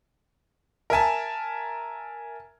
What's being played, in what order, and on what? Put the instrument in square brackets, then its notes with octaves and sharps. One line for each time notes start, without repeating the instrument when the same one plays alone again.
[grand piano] A#4 E5 G#5 A5